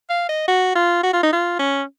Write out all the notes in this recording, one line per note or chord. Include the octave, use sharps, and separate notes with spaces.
F5
D#5
F#4
F4
F#4
F4
D#4
F4
C#4